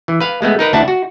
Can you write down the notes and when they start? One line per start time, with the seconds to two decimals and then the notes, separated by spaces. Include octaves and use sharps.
0.08 E3
0.20 B4 F5
0.42 G#3 A3 B3
0.59 D#4 A#4 B4
0.73 D2 D4 E4 F#5 A5
0.88 F#4